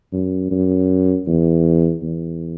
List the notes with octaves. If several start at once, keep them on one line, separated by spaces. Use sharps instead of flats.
F#2
F#2
E2
E2